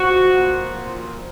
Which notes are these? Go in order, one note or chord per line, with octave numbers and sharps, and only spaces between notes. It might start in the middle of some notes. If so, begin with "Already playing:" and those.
Already playing: F3 F#4
A#2
F3